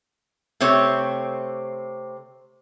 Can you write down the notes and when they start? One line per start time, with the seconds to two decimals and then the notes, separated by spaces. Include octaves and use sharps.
0.61 C3 A3 C4 C#5